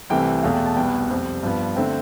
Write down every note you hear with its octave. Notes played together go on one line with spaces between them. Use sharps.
C2 C3 E3 A3 G5
E2 B2 A3 F5
G5
A5
C2 B2 B3 G5
F2 C3 G3 C4
G2 F3 B3
D3 A3 C4 G5